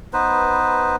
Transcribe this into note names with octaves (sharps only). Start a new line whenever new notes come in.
B3 D#4 B4 C5